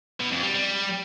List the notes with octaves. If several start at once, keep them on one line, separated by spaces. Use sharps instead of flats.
B2
F2
G3
G3